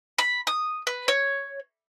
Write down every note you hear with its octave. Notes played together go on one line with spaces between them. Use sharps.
B5
D#6
B4
C#5